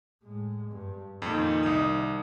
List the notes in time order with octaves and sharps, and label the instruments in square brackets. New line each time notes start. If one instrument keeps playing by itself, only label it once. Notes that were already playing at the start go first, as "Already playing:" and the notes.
[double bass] A2 G#3
G2
[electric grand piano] F2 A#2 [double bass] D#3 D#4
[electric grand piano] C2 D#6